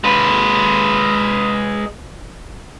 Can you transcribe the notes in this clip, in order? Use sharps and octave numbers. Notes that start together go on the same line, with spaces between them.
G#3 B4